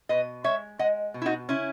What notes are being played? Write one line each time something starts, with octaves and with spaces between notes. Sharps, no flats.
B2 B4 D#5
G#3 C#5 E5
G#3 D#5 F#5
B2
E4
D#4 F#4
C#3 C#4 E4